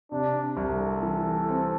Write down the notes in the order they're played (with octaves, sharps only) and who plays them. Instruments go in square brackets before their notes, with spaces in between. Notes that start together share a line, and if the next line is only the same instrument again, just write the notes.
[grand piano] C3 [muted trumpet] D4
[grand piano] C2
[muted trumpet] A4
[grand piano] E3
C4